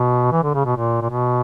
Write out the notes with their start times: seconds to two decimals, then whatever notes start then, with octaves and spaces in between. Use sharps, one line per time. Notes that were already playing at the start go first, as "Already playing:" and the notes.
Already playing: B2
0.32 E3
0.43 D3
0.54 C#3
0.65 B2
0.76 A#2
1.02 A#2
1.10 B2